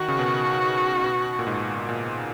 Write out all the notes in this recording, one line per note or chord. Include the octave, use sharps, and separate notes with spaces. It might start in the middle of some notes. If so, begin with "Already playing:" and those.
Already playing: D#3 F#4
C#3
B2
B2
A#2
G#2
A#2